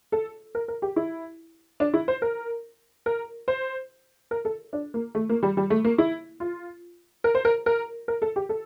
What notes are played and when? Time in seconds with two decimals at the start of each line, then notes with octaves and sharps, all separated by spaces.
0.12 A4
0.55 A#4
0.68 A#4
0.82 G4
0.96 E4
1.80 D4
1.94 E4
2.08 C5
2.22 A#4
3.06 A#4
3.48 C5
4.31 A#4
4.45 A4
4.73 D4
4.94 A#3
5.15 A3
5.29 A#3
5.43 G3
5.57 G3
5.70 A3
5.84 A#3
5.98 E4
6.40 F4
7.24 A#4
7.35 C5
7.45 A#4
7.66 A#4
8.08 A#4
8.22 A4
8.36 G4
8.49 A4